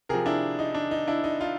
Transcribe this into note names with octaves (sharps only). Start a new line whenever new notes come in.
C3 F3 G#4 A#4
D4 E4
D#4
D4
D#4
D4 E4
D#4
D#4 F4